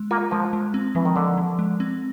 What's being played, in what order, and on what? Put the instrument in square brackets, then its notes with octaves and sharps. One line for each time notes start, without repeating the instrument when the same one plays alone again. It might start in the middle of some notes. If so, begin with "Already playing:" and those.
Already playing: [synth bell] G#3
[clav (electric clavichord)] A#3 [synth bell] F4
[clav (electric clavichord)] F3 [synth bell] G#3
[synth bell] G#3
C4
[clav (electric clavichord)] E3 [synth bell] F3
[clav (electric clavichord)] D#3
[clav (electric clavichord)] D3 [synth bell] F3
[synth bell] F3
G#3
C4